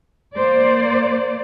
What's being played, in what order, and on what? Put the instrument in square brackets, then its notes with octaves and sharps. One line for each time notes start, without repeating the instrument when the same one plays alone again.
[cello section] A#3 C5 D5